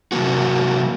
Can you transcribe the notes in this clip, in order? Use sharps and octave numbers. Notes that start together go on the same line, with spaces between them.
C3 E3 F#3 A#3 F#4